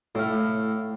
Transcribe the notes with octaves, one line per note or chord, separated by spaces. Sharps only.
A2 F5